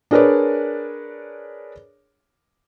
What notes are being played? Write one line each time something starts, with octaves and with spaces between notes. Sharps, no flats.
D4 G#4 A#4 B4 C#5 D5